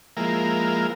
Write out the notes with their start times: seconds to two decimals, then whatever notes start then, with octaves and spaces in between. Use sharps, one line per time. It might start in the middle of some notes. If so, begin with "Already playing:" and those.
0.17 F3 G#3 A#3 E4 A#4